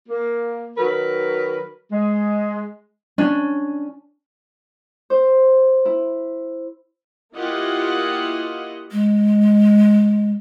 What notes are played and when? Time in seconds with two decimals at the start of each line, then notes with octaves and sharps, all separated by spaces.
0.09 A#3
0.77 D#3 F#3 A#4 B4
1.91 G#3
3.18 C#4 D4
5.10 C5
5.85 E4
7.34 A#3 E4 F4 G4 D#5 F#5
8.91 G#3